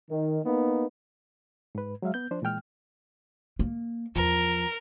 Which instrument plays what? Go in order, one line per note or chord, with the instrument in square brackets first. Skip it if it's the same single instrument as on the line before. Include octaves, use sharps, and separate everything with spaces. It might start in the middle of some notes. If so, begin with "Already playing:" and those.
[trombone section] D#3
A#3 B3 D#4
[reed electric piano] G#2 B4
F#3 G#3 E5 F5
B3 G6
F3 D4 C5
A#2 E3 G#3 G5 F6
[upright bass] A#3
[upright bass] E2 [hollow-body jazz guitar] F3 [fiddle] A#4